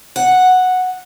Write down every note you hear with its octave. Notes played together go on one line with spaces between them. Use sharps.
F#5